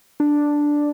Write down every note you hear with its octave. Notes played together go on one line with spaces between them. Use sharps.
D4